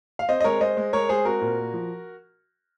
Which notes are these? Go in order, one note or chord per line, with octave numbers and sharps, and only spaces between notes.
F5
C4 C5 D#5
D#5
G#3 A#4 C#5
G#3 C5 D#5
G#3
G#3 A#4 C#5
G#3 G#4 C5
C4 F#4 A#4
A#2
A#3
F3